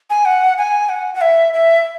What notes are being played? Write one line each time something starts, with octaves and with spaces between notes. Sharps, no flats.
G#5
F#5
G#5
F#5
F#5
E5
E5